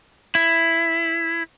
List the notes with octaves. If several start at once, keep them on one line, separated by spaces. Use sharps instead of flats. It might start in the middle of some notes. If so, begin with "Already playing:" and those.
E4